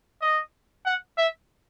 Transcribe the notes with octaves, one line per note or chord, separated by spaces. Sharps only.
D#5
F#5
E5